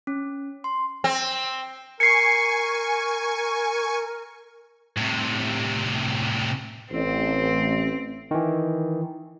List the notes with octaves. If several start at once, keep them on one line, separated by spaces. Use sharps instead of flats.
C#4
C6
C4
A#4 G#5 C#6 C7 C#7
A2 C3
A1 C4
D#3 E3